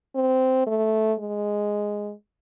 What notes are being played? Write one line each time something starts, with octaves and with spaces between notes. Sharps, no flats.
C4
A3
G#3